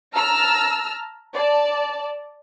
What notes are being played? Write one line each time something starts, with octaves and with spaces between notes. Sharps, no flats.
A5 A#5 E6 F6
D5 A5